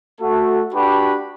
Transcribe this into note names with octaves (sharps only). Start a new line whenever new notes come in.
A3 F#4 A4
D4 F#4 G4 B4 G5 B5